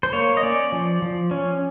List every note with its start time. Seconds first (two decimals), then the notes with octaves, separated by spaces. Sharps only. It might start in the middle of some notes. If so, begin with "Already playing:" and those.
0.03 C5
0.13 A#3 C#5
0.37 D#5
0.43 C#4 D5
0.72 F3
1.02 F3
1.31 C#4